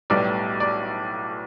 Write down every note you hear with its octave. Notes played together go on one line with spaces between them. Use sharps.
B1 A2 G3 B3 D5
D5